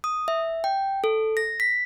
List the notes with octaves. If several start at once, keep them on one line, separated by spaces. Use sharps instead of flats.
D#6
E5
G5
A4
A#6
B6